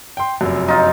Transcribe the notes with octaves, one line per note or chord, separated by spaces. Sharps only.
G5 C6
F1 F#2
D#4 F4